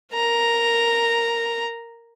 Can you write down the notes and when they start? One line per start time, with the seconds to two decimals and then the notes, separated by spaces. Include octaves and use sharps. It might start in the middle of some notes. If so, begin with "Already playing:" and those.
0.13 A#4 A#5